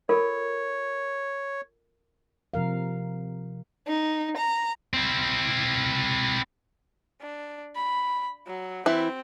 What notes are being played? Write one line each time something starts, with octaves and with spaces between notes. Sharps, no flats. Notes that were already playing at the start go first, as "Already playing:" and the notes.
F4 A4 A#4 C#5
C3 F3 A#4 F5
D#4
A#5
C4 E4
D4
B5
F#3
E3 C4 E4